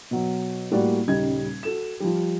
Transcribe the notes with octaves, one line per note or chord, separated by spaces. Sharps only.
B2 F#3
A2 G3 A#3 F#4 D5
D#1 C#3 G3 D#4 G#6
F#4 A4 E7
F3 G3